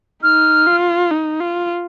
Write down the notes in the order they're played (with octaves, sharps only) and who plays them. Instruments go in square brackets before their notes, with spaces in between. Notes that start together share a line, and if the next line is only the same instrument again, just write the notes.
[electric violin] D#4 [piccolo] F6
[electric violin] F4
D#4
F4